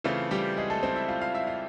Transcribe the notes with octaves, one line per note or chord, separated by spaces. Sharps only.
C#3 E3 A3 C4 F4
G3 G4
G#3 G#4
A3 A4
C4 C5
E4 E5
F4 F5
F4 F5
E4 E5
F4 F5